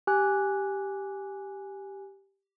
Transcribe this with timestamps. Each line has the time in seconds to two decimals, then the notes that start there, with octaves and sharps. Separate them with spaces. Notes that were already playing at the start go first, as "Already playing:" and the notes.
0.07 G4 G#5 F#6